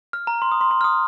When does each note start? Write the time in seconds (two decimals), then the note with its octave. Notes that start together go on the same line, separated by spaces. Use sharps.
0.13 F6
0.27 A#5
0.42 C6
0.52 D#6
0.61 C6
0.71 C6
0.81 F6
0.84 D#6